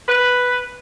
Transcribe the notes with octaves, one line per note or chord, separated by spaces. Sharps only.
B4